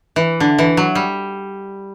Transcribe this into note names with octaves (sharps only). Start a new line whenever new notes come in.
E3
D3
E3
F#3
G3